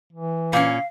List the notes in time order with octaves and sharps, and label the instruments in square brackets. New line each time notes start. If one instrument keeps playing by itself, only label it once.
[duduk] E3
[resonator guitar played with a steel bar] A#2 C#4 [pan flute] F5